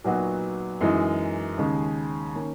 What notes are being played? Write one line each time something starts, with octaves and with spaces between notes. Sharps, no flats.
A#2 F#3 B3 D#4 F#4
F#2 E3 G#3 D#4
D#2 C#3 G#3 D#4
D#3 A#3 C#4